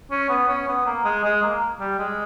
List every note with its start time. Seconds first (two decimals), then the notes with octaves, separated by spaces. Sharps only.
0.11 C#4
0.29 B3
0.49 C#4
0.68 B3
0.86 A#3
1.05 G#3
1.24 G#3
1.42 A#3
1.80 G3
1.98 G#3